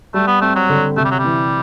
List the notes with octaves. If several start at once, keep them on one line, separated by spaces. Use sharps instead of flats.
G3 A3
B3
A3 C4
F#3
D3
C3 A3
G3
F#3
G3
E3